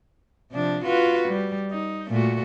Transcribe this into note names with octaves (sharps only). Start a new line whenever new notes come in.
C3 F3 D4
F4 F#4 B4
G3
D#4
A#2 A3 F#4